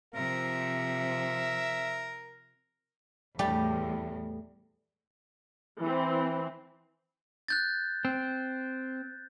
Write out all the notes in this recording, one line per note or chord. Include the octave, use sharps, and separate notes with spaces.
C3 F3 A#4 E5
E2 A2 G3 A3 G4
E3 C4
F#6 G6 A6
C4